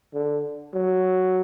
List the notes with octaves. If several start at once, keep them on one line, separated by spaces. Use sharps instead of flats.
D3
F#3